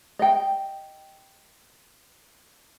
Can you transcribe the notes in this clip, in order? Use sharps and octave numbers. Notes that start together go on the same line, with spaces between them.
D#5 G5